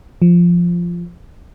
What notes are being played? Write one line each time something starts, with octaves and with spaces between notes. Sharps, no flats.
F3